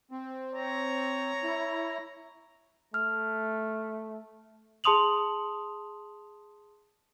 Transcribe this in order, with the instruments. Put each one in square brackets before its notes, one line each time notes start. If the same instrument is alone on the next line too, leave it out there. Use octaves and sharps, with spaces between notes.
[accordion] C4
[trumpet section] C#5 A#5
[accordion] E4
[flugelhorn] A3 [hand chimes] F6
[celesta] G#4 A5 C6 D#6 F7 F#7